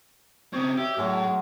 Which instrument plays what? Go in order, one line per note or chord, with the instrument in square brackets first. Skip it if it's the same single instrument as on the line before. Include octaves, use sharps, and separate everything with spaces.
[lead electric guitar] C#3 C4 [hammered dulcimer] C#5 D#5
[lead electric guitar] G4 [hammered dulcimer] E5
[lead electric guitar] A2 [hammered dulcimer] F#3 G#3 A#4